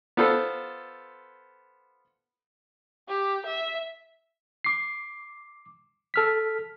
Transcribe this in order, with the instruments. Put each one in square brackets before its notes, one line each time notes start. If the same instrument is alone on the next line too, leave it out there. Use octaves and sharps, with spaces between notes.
[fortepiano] B3 F4 A4 C5
[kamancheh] G4
E5
[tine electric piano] D6 C7
A4 F6 B6